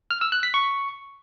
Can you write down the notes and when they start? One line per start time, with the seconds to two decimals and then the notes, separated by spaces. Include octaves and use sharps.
0.11 F6
0.21 E6
0.32 F#6
0.43 B6
0.54 C#6